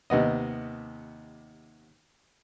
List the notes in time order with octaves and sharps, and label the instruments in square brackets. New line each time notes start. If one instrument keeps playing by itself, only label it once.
[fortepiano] D#2 C3 B3 D#5